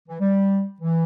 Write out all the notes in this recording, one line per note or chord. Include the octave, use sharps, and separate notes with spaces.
E3
G3
E3